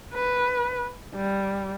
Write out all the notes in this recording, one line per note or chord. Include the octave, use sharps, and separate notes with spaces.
B4
G3